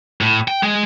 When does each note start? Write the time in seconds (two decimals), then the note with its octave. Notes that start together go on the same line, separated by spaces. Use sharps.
0.21 A2
0.48 G5
0.63 G#3